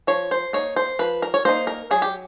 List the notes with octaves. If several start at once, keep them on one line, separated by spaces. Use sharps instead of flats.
F3 C#5
C5
A#3 D#4 C#5
C5
F3 B4
A#4
C#5
A#3 D#4 C5
A#4
F#3 G#4
G4